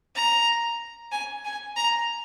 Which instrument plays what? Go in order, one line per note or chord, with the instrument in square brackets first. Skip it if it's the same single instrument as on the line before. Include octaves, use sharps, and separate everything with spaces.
[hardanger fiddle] A#5
G#5
G#5
A#5